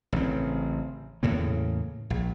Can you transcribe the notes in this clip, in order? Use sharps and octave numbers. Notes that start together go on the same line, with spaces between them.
A1 C#3 C4
E2 A2 C#3 A#3
A#1